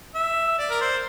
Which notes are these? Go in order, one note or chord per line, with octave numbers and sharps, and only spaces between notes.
E5
D5
A#4
C5